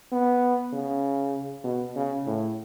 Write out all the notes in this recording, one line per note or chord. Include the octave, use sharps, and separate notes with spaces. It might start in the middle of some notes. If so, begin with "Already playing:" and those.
B3
C#3
B2
C#3
A2